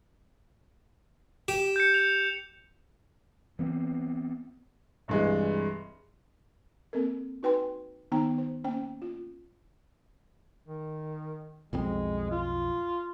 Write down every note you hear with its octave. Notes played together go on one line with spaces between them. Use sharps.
G4 E7
G6 C#7
F7
E3 B3 C4
C2 G2 E3 G#3
A#3 C4 A4 A#4
D#4 F#4 B4 G5 G#5 C6
D#3 B3 D#4 G5 A#5
C5
A#3 C#4 C5 G5
F4
D#3
B1 F2 G#3 C4
F4